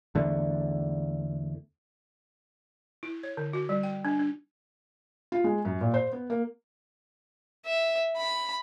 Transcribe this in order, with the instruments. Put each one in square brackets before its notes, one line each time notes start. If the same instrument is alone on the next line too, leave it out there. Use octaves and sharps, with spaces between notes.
[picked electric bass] E2 D3 A3
[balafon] E4
C#5
D3
F#4
G3
G5
D4
D4
[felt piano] F4
G#3
F#2
A#2
C5
B3
A#3
[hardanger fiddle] E5
B5